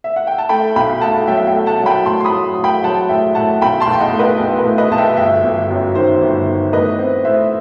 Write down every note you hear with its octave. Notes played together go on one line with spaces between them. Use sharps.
E5
F#5
G5
A5
A3 G5 B5
B1 G5 B5
A3 F#5 A5
F#3 E5 G5
E5 G5
A3
F#5 A5
F#3
G5 B5
A2 A5 C6
C6
B5 D#6
F#3
A2
G5 B5
F#3 F#5 A5
A2 E5 G5
A2 F#5 A5
B1 G5 B5
A5 C6
B1
G5
D#5 F#5
A2
B4 D#5
B1
B4
A2
B4 D#5
B1 A5
E5 G5
G1 E5 G5
G1
F#2
D#3 C5
G1
D#3
A2 B4 D#5
C4
A2 C5 E5